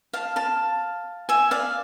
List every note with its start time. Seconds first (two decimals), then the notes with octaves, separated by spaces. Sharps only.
0.13 F5 A5
0.36 F5 A5
1.29 E5 G#5
1.51 D5 F5